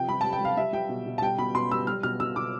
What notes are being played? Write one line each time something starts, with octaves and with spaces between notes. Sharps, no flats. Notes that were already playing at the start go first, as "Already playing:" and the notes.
Already playing: C3 F3 G5
G3 B5
G3 A5
G5
G3 F5
G3 E5
G3 G5
B2
B2
A5
G3 G5
B2 B5
B2 C6
G3 E6
G3 F6
B2 F6
B2 E6
B2 D6